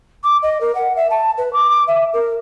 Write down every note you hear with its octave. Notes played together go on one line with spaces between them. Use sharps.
D6
D#5
A#4
F#5
E5
A5
B4
D6
E5
A#4